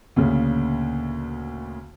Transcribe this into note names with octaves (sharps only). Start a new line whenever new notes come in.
D2 A#2 C#3